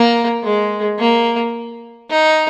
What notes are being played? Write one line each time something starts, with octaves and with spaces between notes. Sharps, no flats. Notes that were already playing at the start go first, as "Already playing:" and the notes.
Already playing: A#3
G#3
A#3
D#4